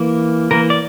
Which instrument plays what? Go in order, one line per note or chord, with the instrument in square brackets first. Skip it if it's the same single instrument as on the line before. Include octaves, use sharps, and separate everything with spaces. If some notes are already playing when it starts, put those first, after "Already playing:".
Already playing: [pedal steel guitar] E3 A#3
E3 A#3 A#4
D5